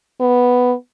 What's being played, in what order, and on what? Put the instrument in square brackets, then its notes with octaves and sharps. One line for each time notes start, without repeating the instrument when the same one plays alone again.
[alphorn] B3